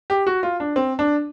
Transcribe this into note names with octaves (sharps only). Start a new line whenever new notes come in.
G4
F#4
F4
D4
C4
D4